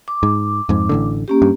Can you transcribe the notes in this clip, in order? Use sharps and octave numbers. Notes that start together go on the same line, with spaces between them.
D6
G#2
F2 G#2
A1 A2 D3
A#3 C#4 G4
G2